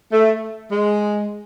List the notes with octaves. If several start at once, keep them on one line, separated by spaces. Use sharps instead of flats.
A3
G#3